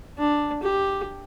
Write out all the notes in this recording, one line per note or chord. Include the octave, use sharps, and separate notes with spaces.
D4
G4